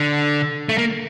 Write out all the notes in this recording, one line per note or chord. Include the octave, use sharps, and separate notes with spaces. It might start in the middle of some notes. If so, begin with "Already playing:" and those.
Already playing: D3
A3
A#3